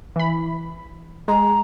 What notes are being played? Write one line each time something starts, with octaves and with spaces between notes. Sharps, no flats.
E3 B5
G#3 A#5